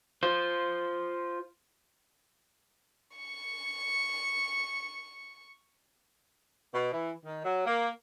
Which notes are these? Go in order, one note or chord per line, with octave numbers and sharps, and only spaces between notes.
F4 C5
C#6 C#7
B2
E3
D#3
F#3
A#3